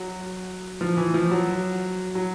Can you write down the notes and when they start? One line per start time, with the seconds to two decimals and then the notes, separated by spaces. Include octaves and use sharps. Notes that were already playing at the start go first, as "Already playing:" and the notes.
Already playing: F#3
0.81 F3
0.97 E3
1.14 F3
1.31 F#3
2.15 F#3